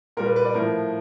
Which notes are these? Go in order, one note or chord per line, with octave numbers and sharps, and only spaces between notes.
A#2 G3 A#4
B4
B4
D5
A2 F3 A#4